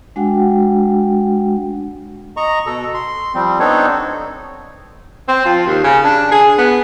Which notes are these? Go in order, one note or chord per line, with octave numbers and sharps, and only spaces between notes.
G#3 D4 F#4 F#5 G5
D#5 A#5 C#6
B2 A4
C6
F3 G3 C4
B3 C4 D4 D#4 A4 C#5
C4
F3
D#2
C#3
D4
G#4
B3